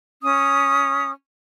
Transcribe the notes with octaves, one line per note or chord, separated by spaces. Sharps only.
C#4 D#6